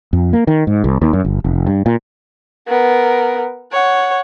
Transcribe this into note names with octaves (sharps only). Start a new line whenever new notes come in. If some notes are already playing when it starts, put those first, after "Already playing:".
F2
A#3
D#3
G#2
C2
D#2
F#2
G1
F1
G2
A#2
B3 A#4
C#5 F#5